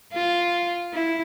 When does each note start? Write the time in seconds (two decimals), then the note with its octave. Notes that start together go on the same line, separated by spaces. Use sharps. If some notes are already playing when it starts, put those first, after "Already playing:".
0.13 F4
0.94 E4